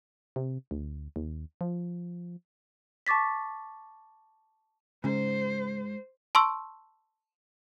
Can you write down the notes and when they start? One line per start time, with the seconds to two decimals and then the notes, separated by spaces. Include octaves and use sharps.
0.36 C3
0.71 D2
1.16 D#2
1.61 F3
3.07 A5 C#6 D6 A6 B6
5.04 G#2 C#3 C#4 C5
6.35 A5 C6 C#6 E6